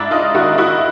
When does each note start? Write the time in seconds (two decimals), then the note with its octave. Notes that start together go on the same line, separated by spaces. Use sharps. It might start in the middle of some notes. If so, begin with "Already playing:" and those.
Already playing: G#2 D4 E4
0.11 D#4 F4
0.34 D#3 E4 F#4
0.58 E4 F#4